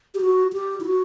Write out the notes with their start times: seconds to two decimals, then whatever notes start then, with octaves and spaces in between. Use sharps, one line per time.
0.14 G4
0.21 F#4
0.53 G4
0.80 E4
0.85 F#4